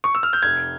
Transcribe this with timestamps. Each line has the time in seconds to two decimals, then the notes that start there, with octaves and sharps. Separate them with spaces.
0.04 C#6
0.15 E6
0.23 F6
0.33 G6
0.43 F1 G#6